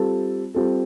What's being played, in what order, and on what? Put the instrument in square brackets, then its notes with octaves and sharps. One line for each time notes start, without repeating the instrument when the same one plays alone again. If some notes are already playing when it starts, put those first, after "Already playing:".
Already playing: [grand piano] G3 C4 F4 A4
G3 C4 F4 A4